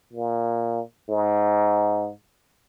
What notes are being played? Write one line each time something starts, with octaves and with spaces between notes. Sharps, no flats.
A#2
G#2